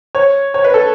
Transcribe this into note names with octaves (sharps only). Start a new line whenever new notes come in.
C#5
C#5
B4
A4